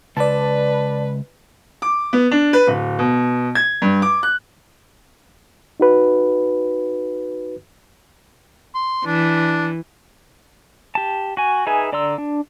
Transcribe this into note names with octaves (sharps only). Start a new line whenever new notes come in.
C#2 B4 D5 A5
D6
B3
D4
B4
D1
B2
G#6
G2
D6
F#6
D#4 F#4 B4
C6
E3 D4
G4 A5
F#4 G#5
D#4 G#4 B4 E5 G#5
D3 D5 A#5 C6 E6
D4